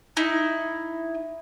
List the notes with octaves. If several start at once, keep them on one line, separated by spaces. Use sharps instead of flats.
D#4 E4